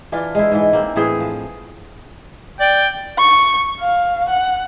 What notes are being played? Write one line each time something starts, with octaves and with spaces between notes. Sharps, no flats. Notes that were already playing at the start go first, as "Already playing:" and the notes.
E3 D4 F4
G#3 E4
G#2 E3
A#3 C4
A2 E3 C4 G#4
F3
D5 G5
C#6
F5
F#5